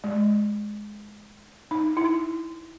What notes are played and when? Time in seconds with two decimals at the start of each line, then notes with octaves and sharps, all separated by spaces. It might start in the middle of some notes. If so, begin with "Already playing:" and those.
0.04 G#3
1.71 D#4
1.97 E4